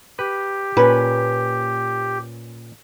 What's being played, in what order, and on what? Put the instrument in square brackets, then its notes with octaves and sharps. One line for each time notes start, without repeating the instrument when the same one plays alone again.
[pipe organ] G4 [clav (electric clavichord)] B4
[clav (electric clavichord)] A#2 C#4 [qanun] B4